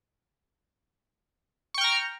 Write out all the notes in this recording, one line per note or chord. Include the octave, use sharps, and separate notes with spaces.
G5 A#5 C#6 F6